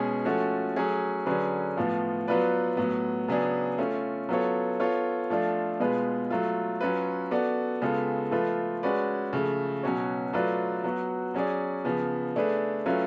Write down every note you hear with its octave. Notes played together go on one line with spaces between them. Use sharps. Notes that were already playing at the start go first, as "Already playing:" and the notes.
Already playing: B2 G#3 C#4 G#4
F3 A3 C#4 F#4
F#3 A3 C#4 G#4
D3 F#3 C#4 G#4 B4
A2 F3 B3 F4
F#3 B3 F4 B4 D5
A2 F#3 B3
C#3 F#3 B3 D4 G#4
A3 C#4 F4
F#3 B3 F4 A4 C#5
B3 F4 A4 C#5
F3 A3 D4 F4
B2 G#3 B3 F4 B4
F#3 A3 F4
F#3 C#4 F4 B4
B3 F#4 A4 D5
C#3 G#3 B3 F4 A4
F3 A3 F4 B4
G#3 C#4 F#4 B4 D5
C#3 F3 A3
B2 F#3 C#4 F#4 C#5
F#3 A3 F4 B4 D5
F#3 B3 F#4
F#3 C#4 G#4 D5
C#3 F3 B3
A3 D4 G#4 B4
F#3 A3 C#4 F4 B4